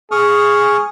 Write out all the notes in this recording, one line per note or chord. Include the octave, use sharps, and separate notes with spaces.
G#4 C#6 D#6 F6